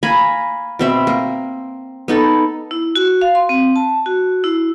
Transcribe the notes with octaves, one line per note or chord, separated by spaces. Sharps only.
A#3 G#5 A#5 B5
B2 C4 E5
A#3
B3 D#4 A4
E4
F#4
F5
C6
C4
A5
F#4
E4